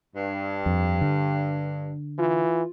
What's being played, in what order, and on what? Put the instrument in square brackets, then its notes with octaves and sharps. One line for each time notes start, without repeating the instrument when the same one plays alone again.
[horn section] G2
[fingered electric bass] F2
D3
[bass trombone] E3 [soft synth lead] F4